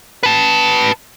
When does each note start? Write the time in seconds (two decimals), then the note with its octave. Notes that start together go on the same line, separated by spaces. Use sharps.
0.23 B4 A5